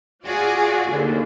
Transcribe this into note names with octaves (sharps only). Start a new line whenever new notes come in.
F4 F#4 G#4 D5 G#5
D#2 D3